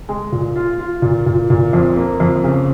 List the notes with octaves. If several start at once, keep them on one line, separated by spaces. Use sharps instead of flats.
G#3
A#2
F4
F4
A#2
A#2
A#2
F2
A#3
F2
C#3